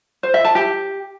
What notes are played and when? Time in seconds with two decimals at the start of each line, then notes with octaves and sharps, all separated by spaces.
0.23 C5
0.34 E5
0.45 A5
0.55 G4